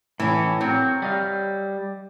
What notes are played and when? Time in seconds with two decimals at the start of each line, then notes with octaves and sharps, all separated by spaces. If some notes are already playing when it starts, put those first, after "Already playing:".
0.20 A2 E3 C#4
0.61 F#3 C4 A#4
1.02 G3 D#5 F5